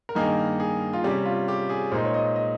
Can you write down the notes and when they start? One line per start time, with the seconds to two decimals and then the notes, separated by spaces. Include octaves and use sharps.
0.09 A#4
0.15 G2 D#3 A#3 D#4 G#4
0.60 G#4
0.93 F4
1.04 C3 G3 C#4 G4
1.26 F4
1.48 G4
1.69 G#4
1.92 A#2 G#3 D#4 C5
2.05 C#5
2.14 D#5
2.36 D#5